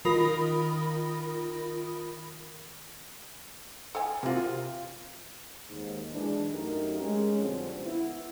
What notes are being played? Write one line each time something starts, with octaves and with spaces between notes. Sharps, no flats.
D#3 F4 A#4 B5 D#6 A#6
A4 F5 G#5
C3 A#3 F4 F#4
D#2 G#2
B1 E3 G#3 D4
F#2 A3 D#4 G4 A#4
G#3 C#4
F2 B2 D3 F3 G3 C4
B3 E4